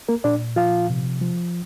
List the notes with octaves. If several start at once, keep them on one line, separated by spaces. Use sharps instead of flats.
A#3 A#4
A#2 D4 D5
F3 F4 F5
C3
F3